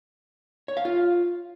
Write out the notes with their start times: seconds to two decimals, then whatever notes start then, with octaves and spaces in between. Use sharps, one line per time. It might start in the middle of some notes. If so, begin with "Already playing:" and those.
0.68 C#5
0.77 F5
0.85 F4